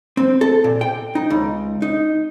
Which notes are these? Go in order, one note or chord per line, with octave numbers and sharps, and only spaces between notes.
C4
A4
A#2
G5
D#4
C#2
D#4